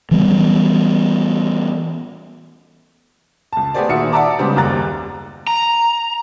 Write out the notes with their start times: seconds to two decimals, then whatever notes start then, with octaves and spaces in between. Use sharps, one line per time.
0.11 E3 F#3 G3 B3
3.53 C#2 A5
3.74 A3 B3 G4 G#4 C5 D5
3.89 A#2 D#3 F#4 E5 D#6 C#7
4.12 D5 E5 F#5 A5 A#5 D6
4.39 C#3 G3 G#3 B3 G4 C5
4.56 F#1 D#2 G3 A#5 F#6 A6
5.47 A#5